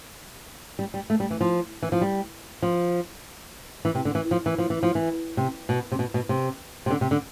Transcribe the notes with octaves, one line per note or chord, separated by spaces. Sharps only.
G3
G3
A3
G3
E3
F3
E3
F3
G3
F3
E3
C3
D3
E3
F3
E3
F3
E3
F3
E3
C3
B2
C3
B2
B2
C3
C3
D3
C3
D3